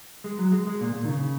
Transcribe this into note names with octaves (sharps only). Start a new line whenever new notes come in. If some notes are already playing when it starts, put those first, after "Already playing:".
G#3
F#3
G#3
G#3
A#2
A#2
D#3
C#3